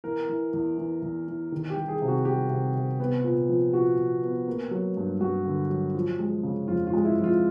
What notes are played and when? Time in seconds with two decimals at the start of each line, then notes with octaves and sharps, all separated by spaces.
0.04 E3 A#4
0.29 E3
0.54 E2
0.78 E3
1.02 E2
1.28 E3
1.52 D#3
1.70 G4
1.76 G3
1.88 G#4
2.02 C3
2.08 F#4
2.25 G3 G4
2.50 C3
2.75 C3
3.00 B3
3.24 A#2
3.49 F3
3.73 A#2 F#4
3.98 A#2
4.23 B3
4.48 A#3
4.71 F#3
4.97 G2
5.20 G2 F#4
5.45 D3
5.69 F#3
5.95 F3
6.19 G#3
6.43 C#3
6.68 F2 F4
6.87 F4
6.93 G#3
7.05 E4
7.18 F2
7.24 F4